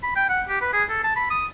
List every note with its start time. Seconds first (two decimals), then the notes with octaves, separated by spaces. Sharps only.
0.03 B5
0.16 G5
0.29 F#5
0.49 G4
0.61 B4
0.73 G#4
0.90 A4
1.04 A5
1.16 B5
1.30 D#6